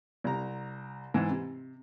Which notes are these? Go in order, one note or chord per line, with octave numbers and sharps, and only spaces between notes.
C2 A#5
G#2 E3
C3